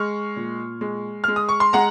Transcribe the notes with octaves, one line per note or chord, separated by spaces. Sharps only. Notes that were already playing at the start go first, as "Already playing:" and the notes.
Already playing: G#3 C#6 F6
A#2
G#3
G#3 F6
D#6
C#6
C6
G#3 F#5 A#5